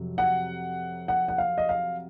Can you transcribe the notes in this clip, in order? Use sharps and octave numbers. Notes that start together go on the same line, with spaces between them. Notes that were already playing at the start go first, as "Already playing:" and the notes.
Already playing: F2 C3 F#3
F#5
F#5
F#5
F5
D#5
F5